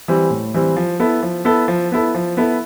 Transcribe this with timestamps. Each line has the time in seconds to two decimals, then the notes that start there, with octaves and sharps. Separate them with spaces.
0.08 E3 G3 C4
0.31 A2
0.54 E3 G3 C4
0.77 F3
1.00 B3 E4 A4
1.23 F3
1.45 B3 E4 A4
1.68 F3
1.92 B3 E4 A4
2.15 F3
2.37 B3 E4 A4